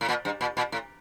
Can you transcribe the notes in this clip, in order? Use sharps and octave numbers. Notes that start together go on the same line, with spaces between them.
A2
A#2
G2
A#2
A#2
A2